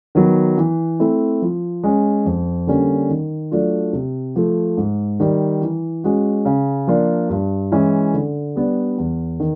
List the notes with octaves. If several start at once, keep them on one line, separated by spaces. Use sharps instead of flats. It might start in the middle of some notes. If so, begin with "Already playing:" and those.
D#3 F#3 B3
E3
A3 C4 E4
F3
G#3 C#4
F2
D3 G3 A#3 C#4
D#3
F#3 A3 D4 F4
C3
F3 A3
G#2
D#3 G3
E3
G#3 C#4 F#4
C#3
F3 A#3 D4 F4
G2
E3 G#3 C#4 E4
D3
G3 B3 D4
E2
D#3